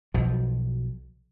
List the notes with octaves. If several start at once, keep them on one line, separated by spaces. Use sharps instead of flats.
B1 B2 F3